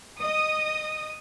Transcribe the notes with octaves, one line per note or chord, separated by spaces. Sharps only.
D#5 D#6